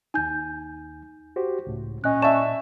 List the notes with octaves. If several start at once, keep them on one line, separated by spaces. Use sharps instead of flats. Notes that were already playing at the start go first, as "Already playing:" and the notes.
D#2 D#4 G#5 G6
F#4 G4 C5
C#2 A2
A#2 C#4 D#5 F#6
D5 E5 A5 C#6 E7